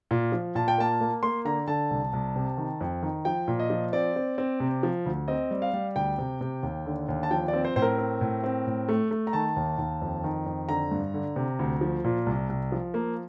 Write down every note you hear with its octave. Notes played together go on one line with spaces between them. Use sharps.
A#2
F3
A#2 A5
G5
A#3 A5
A#3
A#3 C6
D3 A#5
D3 A5
C2
C2
C3
D#3
F2
D#3
F3 G5
A#2
D#5
F3
C4 D5
C4
C4
C3
F3
D2
C4 D#5
G3
F5
G3
D2 G5
C3
C3
D#2
D3
D#2
A5
F3 G5
D5
C4
C5
A2 C5
A#4
C4
A2
C4
A2
A3
A3
A#5
D#3 A5
D#2
D#2
F2
D#3
F2
D3 A#5
G2
D3
C3
D2
F3
A#2
C2
C2
F3
A#3